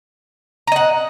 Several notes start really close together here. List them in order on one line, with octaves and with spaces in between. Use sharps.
A#5 D#5 F#5